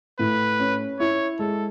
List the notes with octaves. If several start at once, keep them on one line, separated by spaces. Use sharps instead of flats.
A2 B4
C#4
E4 C#5
G#3 A4